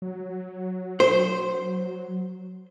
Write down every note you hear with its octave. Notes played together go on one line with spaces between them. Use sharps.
F#3
C5